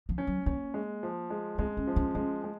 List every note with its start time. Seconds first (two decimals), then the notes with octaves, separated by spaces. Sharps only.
0.09 F3
0.18 C#4
0.27 F#3
0.46 A#3 C#4
0.74 G#3
1.03 F3
1.30 G#3
1.58 G#3 C4
1.77 C#4
1.87 F3
1.96 C#4
2.15 G#3 C#4
2.44 G#3